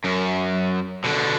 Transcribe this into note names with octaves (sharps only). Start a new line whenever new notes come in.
F#2
B2 D3